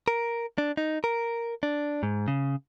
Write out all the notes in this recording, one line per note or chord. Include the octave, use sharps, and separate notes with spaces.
A#4
D4
D#4
A#4
D4
G#2
C#3